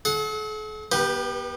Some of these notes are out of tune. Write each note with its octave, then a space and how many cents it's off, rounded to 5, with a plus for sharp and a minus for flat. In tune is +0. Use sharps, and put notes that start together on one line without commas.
A4 -45 F#5 +0
B3 -40 G4 +0 B4 +0